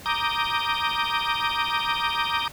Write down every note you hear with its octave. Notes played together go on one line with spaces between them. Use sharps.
A#5 D6 D#6 G6